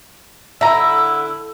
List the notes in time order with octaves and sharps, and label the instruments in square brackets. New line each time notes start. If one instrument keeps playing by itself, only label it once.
[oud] D3 [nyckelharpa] E4 [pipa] E5 A#5 [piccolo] E6